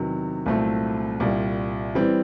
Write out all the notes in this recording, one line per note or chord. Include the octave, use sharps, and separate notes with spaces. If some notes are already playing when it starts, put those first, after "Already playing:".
Already playing: E2 C3 D#3 F#3
C2 A#2 F#3 A3 C4
C2 A#2 G3
E3 G3 C4